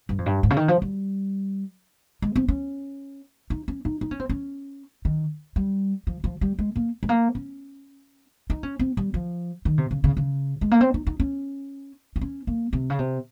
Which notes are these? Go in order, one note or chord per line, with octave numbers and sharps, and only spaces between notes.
G2
F2
G2
G#2
C#3
D#3
F3
G3
G#3
C4
C#4
D#4
C#4
D#4
D#4
C#4
C4
C#4
D#3
G3
F3
F3
G3
G#3
A#3
G#3
A#3
C#4
D#4
C#4
C4
G3
F3
D#3
C3
C#3
C#3
C#3
G#3
A#3
C4
D#4
D#4
C#4
D#4
C#4
A#3
C3
C#3
C3